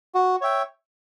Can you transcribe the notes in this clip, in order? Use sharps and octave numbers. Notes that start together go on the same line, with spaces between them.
F#4
C#5 E5 G5